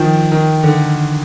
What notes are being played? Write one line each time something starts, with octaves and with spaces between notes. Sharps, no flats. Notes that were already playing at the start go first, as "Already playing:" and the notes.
Already playing: D#3 F3
D#3
D3